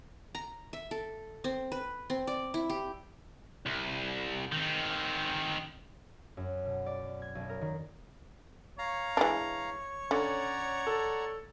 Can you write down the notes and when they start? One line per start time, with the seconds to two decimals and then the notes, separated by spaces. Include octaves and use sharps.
0.35 A#5
0.73 E5
0.91 A4
1.44 C4
1.72 B4
2.10 C4
2.27 D5
2.54 E4
2.70 G4
3.66 C2
4.52 D#3 C4
6.37 F#2
6.65 B2
6.86 D5
7.22 G#6
7.35 B1
7.49 A#4
7.61 D#3
8.79 C#5 F5 A#5
9.17 E3 G#3 D4
10.11 D3 C#4 D5 F#5 A#5
10.87 A4